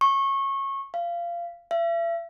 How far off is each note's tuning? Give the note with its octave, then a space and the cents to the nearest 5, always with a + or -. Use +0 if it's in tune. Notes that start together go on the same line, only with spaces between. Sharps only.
C#6 -25
F5 -20
E5 +40